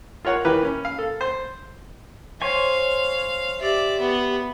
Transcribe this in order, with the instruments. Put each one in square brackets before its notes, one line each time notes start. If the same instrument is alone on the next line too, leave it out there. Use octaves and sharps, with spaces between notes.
[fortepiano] F4 A#4 C#5 F#5
E3 G4 A#4 B4
C#4
F5
A4
C5
[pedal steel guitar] C5 C#5 G#5 [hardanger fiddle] F5
[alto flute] G4 [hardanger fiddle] D5 E5
[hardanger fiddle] B3